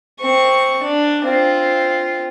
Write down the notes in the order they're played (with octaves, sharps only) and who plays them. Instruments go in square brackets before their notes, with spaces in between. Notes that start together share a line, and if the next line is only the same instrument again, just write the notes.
[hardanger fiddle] C4 C#6
D4
C4 F4